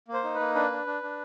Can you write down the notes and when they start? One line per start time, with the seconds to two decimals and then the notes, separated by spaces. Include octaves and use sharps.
0.08 A#3
0.13 C5
0.24 D#4
0.34 B4
0.40 A#3
0.55 D4 B4
0.71 D4
0.87 D4
1.03 D4